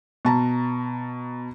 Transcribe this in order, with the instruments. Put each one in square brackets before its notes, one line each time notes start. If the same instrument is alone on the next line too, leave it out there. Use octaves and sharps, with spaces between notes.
[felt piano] B2 A5 A#5